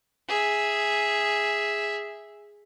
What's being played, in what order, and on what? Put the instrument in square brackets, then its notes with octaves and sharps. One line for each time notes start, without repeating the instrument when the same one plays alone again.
[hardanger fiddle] G#4 E5